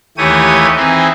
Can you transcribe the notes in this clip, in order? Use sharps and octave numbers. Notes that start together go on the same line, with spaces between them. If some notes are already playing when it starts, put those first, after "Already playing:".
D#2 E3 A3 G4 C#5 D#6
E3 C4 D#4 G#4